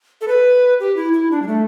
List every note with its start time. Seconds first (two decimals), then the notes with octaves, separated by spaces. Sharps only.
0.21 A4
0.28 B4
0.80 G4
0.96 E4
1.13 E4
1.31 D4
1.42 G3
1.47 A3